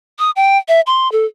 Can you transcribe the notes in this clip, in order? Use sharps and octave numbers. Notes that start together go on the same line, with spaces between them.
D#6
G5
E5
C6
A4